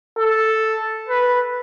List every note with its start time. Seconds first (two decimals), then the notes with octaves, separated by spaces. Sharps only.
0.18 A4
1.09 B4